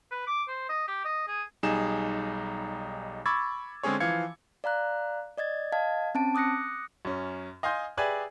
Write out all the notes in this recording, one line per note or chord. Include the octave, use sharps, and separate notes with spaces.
B4
D6
C5
D#5
G4
D#5
G#4
B1 G3 D#4 G#4 E7
B5 C#6 D6 E6 G#6 A6
D3 G#3 C4 C#4 G#4 C#5
E3 F3 F5 G#6 C#7
D5 F5 A#5 F#6
D5 D#5 G#6 A6
D#5 F5 A5 G#6
C4 C#4 A5 D7
D6 D#6 F#6 A#6 C#7
F#2 C#4
D#5 F5 G#5 C6 G6
G4 G#4 B4 D5 E5 G#5